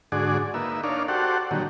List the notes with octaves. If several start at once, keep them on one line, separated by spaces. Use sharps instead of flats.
G#2 D3 F#4 G#4 D5
A#3 D#4 B4 E5
D4 D#4 A#4 C#5 D5 F5
F#4 G4 A4 C5 D5 F#5
A#2 D3 D#3 F#3 G3